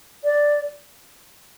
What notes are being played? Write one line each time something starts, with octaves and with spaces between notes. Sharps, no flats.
D5